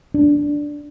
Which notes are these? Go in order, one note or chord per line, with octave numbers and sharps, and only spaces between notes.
D4